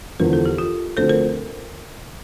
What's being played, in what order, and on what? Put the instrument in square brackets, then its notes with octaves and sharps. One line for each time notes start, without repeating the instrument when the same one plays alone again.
[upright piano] E1 E2 D3 F3 [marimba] A#4
[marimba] A4
G4
F4 A4
[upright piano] D2 D3 F3 C4 [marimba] A4 C5
[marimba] A#4